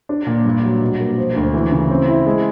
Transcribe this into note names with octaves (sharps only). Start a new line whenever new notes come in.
D4
A#2
G2
F#3
B2
A#3
F3
D2
E3
C#3
C4
E4
G#3